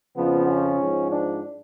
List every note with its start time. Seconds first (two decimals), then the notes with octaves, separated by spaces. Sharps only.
0.16 F2 C#3 F3 B3
0.48 C#4
0.78 G#2 F3
1.10 D4